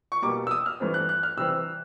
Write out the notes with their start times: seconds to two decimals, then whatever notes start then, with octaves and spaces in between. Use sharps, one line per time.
0.12 C#6
0.22 B2 G3 A#3 D6
0.47 E6
0.51 D#6
0.66 F6
0.80 G2 E3 A3 C4
0.94 F#6
1.09 F#6
1.23 F6
1.37 C3 E3 G3 C4 E6